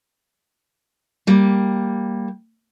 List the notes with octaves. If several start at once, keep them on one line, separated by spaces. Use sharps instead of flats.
G3 A#3